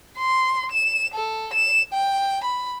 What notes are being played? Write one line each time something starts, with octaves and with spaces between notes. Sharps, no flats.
C6
E7
A4
E7
G5
B5